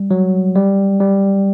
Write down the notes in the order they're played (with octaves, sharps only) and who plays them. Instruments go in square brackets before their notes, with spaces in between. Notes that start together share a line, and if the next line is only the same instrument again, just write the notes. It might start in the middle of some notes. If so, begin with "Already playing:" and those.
Already playing: [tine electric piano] G3
F#3
G3
G3